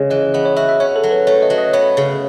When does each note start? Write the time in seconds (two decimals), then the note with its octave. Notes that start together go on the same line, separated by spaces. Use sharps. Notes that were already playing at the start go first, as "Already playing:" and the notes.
Already playing: C#3 G#3
0.10 E3 D#5
0.34 B3 D#5
0.45 C#5
0.56 F#4 E5
0.69 E5
0.80 C#4 C#5
0.96 A4
1.03 F#3
1.11 B4
1.27 A3 C#5
1.42 D#5
1.50 F#3
1.58 D#5
1.73 B3 C#5
1.97 C#3